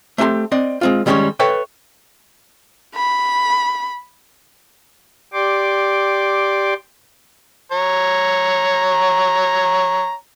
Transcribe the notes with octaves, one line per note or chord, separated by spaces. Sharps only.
A3 C4 G4 A5 C6
C4 D5 D#5
G#3 C4 F4
D#3 G3 G#3 A#3 C#4 C#5
A4 B4 C#5 E5 G5
B5
G4 D5 G5 C6 D6
C#5 A#5